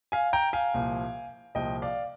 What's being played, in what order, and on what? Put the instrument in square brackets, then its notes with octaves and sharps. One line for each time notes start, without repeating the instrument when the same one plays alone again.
[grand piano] F5 G#5
G5 A#5
F5 G#5
C2 A#2 F3
C2 A#2 F3 D#5 G5
D5 F5